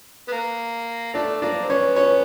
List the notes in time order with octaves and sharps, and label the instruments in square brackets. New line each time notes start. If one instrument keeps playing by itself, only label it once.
[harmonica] B3
A#3
[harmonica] A3 [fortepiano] D4 D5
[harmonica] A#3 [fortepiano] D4 D5
[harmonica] C4
[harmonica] B3 [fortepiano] C#4 C#5
[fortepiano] C#4 C#5